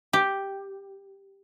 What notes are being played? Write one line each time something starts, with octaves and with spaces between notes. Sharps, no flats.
G4